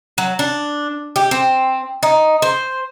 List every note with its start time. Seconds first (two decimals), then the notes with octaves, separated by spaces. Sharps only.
0.18 F#3
0.39 D4
1.16 G4
1.31 C4
2.03 D#4
2.42 C5